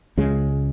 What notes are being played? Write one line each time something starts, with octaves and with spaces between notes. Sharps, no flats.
C#2 C#3 G#3